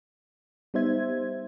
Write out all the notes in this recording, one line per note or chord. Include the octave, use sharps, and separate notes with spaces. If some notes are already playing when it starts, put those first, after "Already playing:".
G3 B3 D#4 C5 E5 G#6